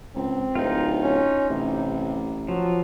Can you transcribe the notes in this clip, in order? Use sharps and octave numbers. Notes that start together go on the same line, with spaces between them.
C#2 C4
D1 D#4 F4
C#4
A1 C3
F3 F#3